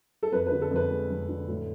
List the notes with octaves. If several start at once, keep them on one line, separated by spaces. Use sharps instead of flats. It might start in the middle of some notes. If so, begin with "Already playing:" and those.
A4
F2 B4
B4
D3
A4
F2 B4
G#3
F2
D3
A2